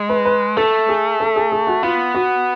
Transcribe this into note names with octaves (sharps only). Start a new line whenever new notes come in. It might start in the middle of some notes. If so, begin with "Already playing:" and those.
Already playing: G#3
B4
B4
A3 A4
G#4
A4
G#4
G#4
F#4
B3 F4
F#4